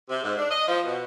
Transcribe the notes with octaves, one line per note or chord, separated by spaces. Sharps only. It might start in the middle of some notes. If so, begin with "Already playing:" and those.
C3
G#2
D4
D#5
F3
B2